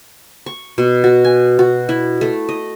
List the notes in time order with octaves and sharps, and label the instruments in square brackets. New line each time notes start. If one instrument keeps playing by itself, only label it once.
[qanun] C#6
B2
F#4
G#5
F#4
E4
A3
D#5